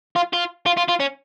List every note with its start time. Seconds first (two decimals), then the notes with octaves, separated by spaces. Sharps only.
0.16 F4
0.33 F4
0.66 F4
0.77 F4
0.89 F4
1.00 C#4